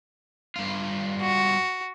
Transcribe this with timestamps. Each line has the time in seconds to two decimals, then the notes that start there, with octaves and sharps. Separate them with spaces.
0.56 G2 F4
1.21 F#4